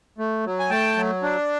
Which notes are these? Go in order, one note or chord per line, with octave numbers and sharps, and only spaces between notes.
A3
F#3
G#5
A3 G5 A5
F#3
D4